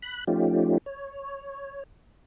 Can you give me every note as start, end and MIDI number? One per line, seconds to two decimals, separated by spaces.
0.02 0.24 83
0.02 0.24 90
0.27 0.78 53
0.27 0.78 57
0.27 0.78 61
0.27 0.78 63
0.27 0.78 65
0.27 0.78 67
0.86 1.83 73